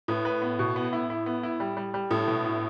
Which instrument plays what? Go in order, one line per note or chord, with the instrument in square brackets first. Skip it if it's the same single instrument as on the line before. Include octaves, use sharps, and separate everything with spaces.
[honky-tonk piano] A2 [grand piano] B4
[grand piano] B4
B3
B2
B3
E4
E4
B3
E4
G3
G3
G3
[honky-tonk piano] A2 [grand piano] A4
[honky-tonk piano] B2 [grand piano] E4
[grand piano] E4